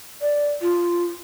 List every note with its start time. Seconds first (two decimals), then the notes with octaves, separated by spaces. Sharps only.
0.22 D5
0.62 F4